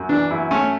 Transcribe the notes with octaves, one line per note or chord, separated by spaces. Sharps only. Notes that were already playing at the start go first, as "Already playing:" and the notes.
Already playing: F#2
E3 D4
F#2 E4
A3 C#4